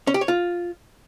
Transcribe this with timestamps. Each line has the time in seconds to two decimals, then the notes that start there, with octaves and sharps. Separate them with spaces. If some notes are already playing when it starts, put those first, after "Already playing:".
0.07 C#4
0.14 G4
0.21 C#5
0.28 F4